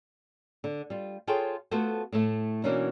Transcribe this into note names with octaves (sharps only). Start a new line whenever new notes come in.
D3
G3 F4
F4 G#4 A4 C5 C#5 G5
A3 B3 F4 F#4 A4 C5
A2 A3
B2 E3 A#3 C#4 D4